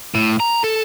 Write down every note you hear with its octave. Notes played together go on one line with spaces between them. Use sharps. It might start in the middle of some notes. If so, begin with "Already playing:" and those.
A2
A#5
A4